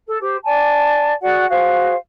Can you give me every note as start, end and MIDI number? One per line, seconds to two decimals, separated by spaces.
0.07 0.17 69
0.20 0.35 67
0.20 0.35 72
0.44 1.10 74
0.44 1.10 80
0.44 1.10 81
1.21 1.44 66
1.21 1.44 68
1.21 1.44 74
1.21 1.44 78
1.49 1.94 66
1.49 1.94 68
1.49 1.94 72
1.49 1.94 77